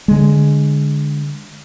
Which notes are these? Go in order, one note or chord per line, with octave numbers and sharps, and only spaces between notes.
D3 G#3